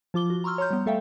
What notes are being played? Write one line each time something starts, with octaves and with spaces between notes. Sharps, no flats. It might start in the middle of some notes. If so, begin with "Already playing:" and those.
F3 F4 D6 G7
F#4
A#5 C6 C#6 E6 F6
C#5 A#5 C6 F6 G6
G3 B3
A3 A4 E5 F5 G5